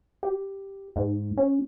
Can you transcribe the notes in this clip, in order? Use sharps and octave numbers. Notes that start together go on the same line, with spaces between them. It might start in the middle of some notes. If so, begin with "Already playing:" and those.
G4
G#2
C#4